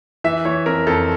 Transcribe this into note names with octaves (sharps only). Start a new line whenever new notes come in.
E3 E5
E3 C#5
F2 A#4
F2 A4